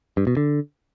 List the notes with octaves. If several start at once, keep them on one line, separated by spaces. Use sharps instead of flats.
G2
B2
D3